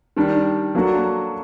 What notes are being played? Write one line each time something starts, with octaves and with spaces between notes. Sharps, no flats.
D#3 G3 D4
F#3 A#3 D4 F#4 A4